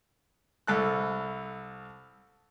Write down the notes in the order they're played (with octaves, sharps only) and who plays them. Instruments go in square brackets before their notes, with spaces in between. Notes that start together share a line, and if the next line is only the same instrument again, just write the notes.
[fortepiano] C2 A4 F#6